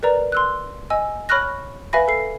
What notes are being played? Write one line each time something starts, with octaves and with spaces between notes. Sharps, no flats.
A#4 B4 D5 A#5
C6 E6 F#6
D#5 G#5 E6
C#5 B5 C#6 F6 F#6 A#6
B4 E5 F5 G#5 B5 A#6
A4 C7